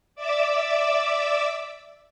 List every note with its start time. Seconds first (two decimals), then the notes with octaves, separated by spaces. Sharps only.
0.15 D5 E5 D6 E6